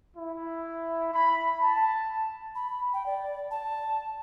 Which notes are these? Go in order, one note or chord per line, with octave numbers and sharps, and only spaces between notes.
E4
B5
A5
B5
G5
D5
A5